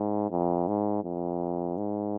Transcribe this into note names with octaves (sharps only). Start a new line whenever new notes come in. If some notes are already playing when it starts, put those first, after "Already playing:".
Already playing: G#2
F2
G#2
F2
G#2